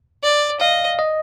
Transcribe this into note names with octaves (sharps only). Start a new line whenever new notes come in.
D5
D#5 F5
D#5